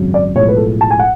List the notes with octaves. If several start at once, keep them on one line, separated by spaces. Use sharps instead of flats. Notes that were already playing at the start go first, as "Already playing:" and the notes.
Already playing: G#1 F#2 C#3 F#3
D5
B1 A2 F3 G#3 C#5
B4
A4
A5
G#5
F#5